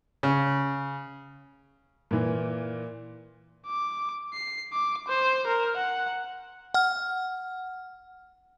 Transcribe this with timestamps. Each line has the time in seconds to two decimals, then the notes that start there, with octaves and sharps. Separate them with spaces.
0.23 C#3
2.11 A#2 E3
3.67 D6
4.33 C7
4.73 D6
5.08 C5
5.47 A#4
5.77 F#5
6.74 F#5 F6